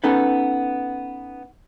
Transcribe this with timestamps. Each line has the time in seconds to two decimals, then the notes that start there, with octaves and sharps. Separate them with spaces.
0.04 B3 C#4 D#4 A4 B4